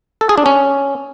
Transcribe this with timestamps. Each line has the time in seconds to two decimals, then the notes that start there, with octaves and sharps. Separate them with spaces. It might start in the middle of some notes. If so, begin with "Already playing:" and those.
0.21 A4
0.29 G#4
0.37 D4
0.46 C#4